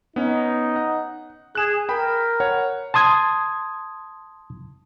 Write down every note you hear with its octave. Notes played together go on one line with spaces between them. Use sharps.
B3 C#4 D#4
F#5
G#4 F#6 E7
A#4 G5 B5
C#5 F#5
A5 C6 D#6 G#6